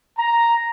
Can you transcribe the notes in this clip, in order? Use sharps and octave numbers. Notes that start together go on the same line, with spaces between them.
A#5